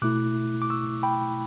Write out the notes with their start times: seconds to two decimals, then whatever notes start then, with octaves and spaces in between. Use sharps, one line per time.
0.02 B2 A3 E4 D6 F#6
0.62 D6
0.70 C#6 E6
1.03 G5 B5